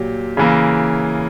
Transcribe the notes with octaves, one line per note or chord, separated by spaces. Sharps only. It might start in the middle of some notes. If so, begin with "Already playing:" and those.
Already playing: A#2 F#3 G4
C#3 E3 A#3